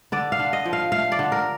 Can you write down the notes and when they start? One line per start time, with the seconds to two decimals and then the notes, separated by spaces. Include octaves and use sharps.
0.12 D3 D5
0.32 F5
0.39 D3
0.53 D#5
0.65 F3
0.73 F5
0.92 A3 F5
1.12 D5
1.19 D3
1.32 A#4